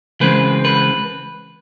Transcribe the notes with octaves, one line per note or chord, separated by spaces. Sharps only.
C#3 E3 G#3 C4 B4
B4